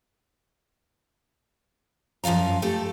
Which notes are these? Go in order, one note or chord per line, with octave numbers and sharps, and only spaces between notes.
F#2 F3 F4 F5 A#5
A3 G4 A4